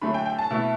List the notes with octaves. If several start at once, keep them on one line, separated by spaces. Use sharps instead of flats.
D3 F#3 A3 B5
G5
G5
A5
B2 A3 E4